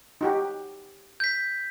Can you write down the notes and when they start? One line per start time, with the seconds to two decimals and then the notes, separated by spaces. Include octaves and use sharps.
0.21 D#4 F#4 G4
1.20 G6 B6